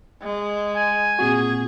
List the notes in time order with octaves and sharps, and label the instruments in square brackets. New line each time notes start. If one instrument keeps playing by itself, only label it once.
[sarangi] G#3
[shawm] G#5
[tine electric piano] A#2 C4 F#4 [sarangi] G#4